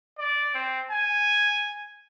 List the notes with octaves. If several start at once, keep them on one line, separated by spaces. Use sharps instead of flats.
D5
C4
G#5